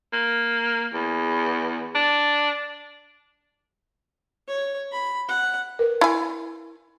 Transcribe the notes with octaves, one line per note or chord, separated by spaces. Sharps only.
A#3
E2
D4
C#5
B5
F#5
A#4 B4
E4 G#5